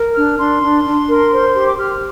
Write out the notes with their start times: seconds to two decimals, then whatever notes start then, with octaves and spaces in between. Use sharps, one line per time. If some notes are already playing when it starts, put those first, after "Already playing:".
Already playing: A#4
0.14 D4 F6
0.38 D4 C6
0.61 D4
0.84 D4
1.08 A#4
1.31 C5
1.54 G4
1.66 D6
1.77 G4 F6